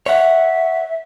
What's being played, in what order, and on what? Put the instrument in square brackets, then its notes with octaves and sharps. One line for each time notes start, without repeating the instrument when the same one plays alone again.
[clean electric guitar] C#5 F#5 [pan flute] E5